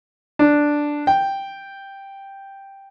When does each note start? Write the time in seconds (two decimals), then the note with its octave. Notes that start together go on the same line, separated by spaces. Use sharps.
0.39 D4
1.07 G5